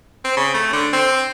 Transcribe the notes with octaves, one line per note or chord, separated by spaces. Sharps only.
C4
C#3
A3
D3
C4